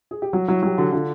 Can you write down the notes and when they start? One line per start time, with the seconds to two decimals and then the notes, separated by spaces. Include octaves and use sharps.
0.11 G#4
0.22 G4
0.33 F#3 F#4
0.48 F#3 E4
0.63 F#3 G4
0.78 D3 F#4
0.92 D3 F4